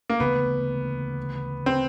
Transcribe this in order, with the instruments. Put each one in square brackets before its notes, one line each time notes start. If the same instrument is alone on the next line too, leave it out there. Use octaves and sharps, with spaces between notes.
[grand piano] A#3
[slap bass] D2 C#3 E3 A3 [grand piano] B3
[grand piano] C4